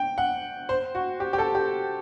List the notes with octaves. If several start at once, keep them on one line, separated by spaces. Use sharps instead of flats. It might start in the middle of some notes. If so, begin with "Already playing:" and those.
Already playing: G5
F#5
C5
F#4
G4
G4
A4
G4